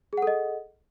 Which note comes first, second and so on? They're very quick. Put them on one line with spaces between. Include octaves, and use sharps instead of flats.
G#4 F#5 A4 D#5